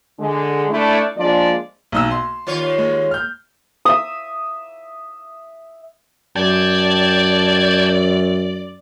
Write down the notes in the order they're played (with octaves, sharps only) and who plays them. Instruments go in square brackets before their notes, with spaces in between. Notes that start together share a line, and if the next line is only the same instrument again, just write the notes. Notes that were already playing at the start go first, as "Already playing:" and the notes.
[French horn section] D3 G#3
A3 D4 E4
F3 G#3 A#3 D4 D5
[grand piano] B1 D#4 E6
C6
[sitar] D#2 F4 C#5
[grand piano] G#3
F6 G6
[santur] E5 D#6
[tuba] F#2 [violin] D5 [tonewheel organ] G5 A5 G#6